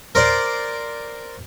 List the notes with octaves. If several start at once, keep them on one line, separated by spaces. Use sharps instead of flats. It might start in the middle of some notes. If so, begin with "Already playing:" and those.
A#4 C5 D5